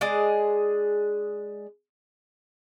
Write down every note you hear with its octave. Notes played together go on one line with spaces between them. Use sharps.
G#3 D4 G#4 D#5